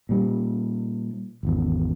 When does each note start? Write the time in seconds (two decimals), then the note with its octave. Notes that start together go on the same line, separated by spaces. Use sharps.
0.09 A#2 G3
1.43 G#1 E2